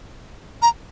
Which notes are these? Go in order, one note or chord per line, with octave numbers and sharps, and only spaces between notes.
A#5